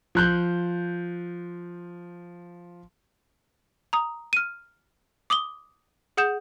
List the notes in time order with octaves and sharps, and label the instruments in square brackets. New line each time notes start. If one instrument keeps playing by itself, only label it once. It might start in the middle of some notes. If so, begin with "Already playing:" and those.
[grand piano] F3 F#6 G6
[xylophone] A#5 D#6
F6 D#7
D6 D#6 F#7 G7
G#4 F#5 D#6 G6 E7